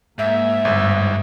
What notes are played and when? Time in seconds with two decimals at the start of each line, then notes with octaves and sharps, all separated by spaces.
0.19 G#2 A#3 E5
0.65 G1 G2